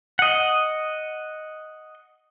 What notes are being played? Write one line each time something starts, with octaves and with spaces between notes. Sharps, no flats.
D#5 F#5